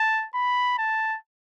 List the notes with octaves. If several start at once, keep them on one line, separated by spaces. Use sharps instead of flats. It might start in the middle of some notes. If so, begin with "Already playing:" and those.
Already playing: A5
B5
A5